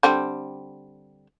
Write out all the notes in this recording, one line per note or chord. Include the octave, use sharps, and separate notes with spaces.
D3 G3 C4